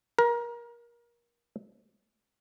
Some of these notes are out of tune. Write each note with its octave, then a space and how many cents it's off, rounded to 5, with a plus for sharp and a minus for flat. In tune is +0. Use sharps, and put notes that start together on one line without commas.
A#4 +25